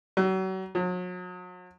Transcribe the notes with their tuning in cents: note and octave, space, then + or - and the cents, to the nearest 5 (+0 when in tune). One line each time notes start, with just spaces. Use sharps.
F#3 +35
F#3 -40